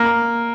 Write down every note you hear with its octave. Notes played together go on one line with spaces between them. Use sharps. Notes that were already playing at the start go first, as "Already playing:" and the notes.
Already playing: A#3